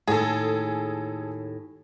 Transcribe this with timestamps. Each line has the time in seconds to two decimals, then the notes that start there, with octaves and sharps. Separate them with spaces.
0.08 D#2 A2 G#4 A4